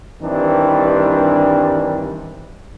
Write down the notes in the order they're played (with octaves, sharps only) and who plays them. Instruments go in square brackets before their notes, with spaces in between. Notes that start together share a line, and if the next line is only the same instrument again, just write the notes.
[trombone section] G2 D#3 E3 G3 C4 D4